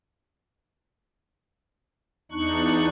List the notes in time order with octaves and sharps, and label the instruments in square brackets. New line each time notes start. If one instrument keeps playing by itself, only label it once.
[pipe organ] E2 D4 D#4 C#6 F#6